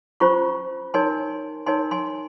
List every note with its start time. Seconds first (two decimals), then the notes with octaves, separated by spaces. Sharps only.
0.20 C#4 F4 C5 A#5 C#6
0.94 D#4 A#4 C#5 G#5 C6
1.66 D#4 A#4 C#5 G#5 C6
1.91 G#5 C6